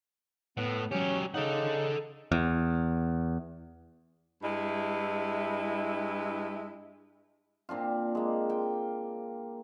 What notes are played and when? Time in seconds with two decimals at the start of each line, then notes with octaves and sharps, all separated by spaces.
0.57 A2 B3
0.91 F#3 C#4 G4
1.34 C#3 D#4 A4 F#5
2.32 E2
4.42 G2 G#3 E4
7.69 A#2 C4 D4 F4
8.15 G#3 A#3
8.50 G5